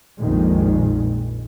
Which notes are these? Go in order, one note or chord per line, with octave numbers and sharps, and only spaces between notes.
A#1 F2 A#2 D#3 G#3